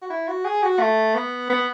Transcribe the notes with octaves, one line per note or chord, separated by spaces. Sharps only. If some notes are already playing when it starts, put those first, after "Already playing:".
F#4
E4
F#4
G#4
F#4
A3
B3
B3